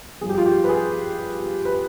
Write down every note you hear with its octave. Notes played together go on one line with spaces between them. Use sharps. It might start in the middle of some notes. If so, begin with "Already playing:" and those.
G2 F3 G#4
G4
F4
G4
B4
G#4
B4